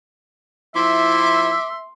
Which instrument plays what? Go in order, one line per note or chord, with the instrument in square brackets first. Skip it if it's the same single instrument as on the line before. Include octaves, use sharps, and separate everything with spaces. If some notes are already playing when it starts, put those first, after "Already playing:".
[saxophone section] F3 E4 [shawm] E5 [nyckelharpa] C6 [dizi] D6